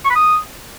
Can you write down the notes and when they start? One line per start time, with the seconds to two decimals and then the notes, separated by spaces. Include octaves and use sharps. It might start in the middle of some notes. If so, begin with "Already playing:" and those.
0.05 C#6
0.10 B5
0.15 D#6